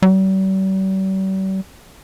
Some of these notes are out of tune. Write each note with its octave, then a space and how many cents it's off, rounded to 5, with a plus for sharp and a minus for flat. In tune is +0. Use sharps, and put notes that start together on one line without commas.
G3 -45